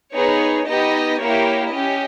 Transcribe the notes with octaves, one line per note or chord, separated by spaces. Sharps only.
B3 D#4 G#4 C#5
B3 D#4 G4 D#5
A#3 E4 G4 C#5
C#4 G4 D#5